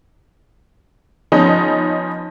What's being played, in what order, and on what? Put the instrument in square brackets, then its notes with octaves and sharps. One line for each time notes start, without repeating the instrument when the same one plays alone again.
[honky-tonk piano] F3 B3 C#4 D#4